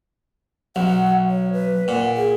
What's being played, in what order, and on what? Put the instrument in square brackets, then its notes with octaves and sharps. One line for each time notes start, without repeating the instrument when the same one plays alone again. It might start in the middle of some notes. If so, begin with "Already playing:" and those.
[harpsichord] B1 [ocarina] F#5
[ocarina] C#5
B4
[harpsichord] A#2 [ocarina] F#5
[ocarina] G#4